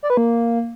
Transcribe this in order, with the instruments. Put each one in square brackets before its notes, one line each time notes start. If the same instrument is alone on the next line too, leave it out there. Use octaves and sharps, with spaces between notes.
[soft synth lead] D5
B4
A#3